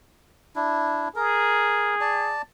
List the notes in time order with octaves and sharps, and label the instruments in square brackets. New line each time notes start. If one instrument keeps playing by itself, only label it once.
[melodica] D4 E4
[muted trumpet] G#4 [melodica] A#4
[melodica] D5 A5